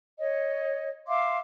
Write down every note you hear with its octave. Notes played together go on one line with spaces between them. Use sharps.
C#5 D#5
E5 F5 C6 D6